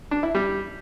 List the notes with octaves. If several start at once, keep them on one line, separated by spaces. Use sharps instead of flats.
D4
E4
G3